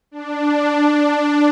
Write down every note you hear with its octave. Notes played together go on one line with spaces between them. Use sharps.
D4